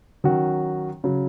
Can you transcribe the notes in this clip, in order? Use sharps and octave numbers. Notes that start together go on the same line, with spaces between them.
D#3 F#3 C#4 F#4
C#3 F#3